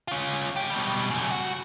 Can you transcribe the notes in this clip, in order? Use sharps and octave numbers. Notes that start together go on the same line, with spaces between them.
C#4 F4
F#3 G4
B2 G3
F#2 C#3
C#2 F#4